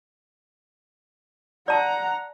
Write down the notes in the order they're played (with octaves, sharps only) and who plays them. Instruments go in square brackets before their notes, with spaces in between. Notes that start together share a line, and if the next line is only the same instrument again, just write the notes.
[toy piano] D5 A5 [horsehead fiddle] F#5 A#5